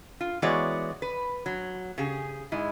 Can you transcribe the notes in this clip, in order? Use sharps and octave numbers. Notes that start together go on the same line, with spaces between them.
F4
E3 G#3 B3 F#4 C#5 D5
B4
F#3
C#3 G4 G#4
G#2 G#3 E4